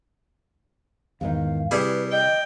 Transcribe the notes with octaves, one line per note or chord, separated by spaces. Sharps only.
E2 G#2 D#3 F5
C3 G3 E4 G#4 B4
D#5 G5